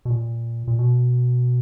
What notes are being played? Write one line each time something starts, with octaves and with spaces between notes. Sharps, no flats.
B2
A#2
A#2
B2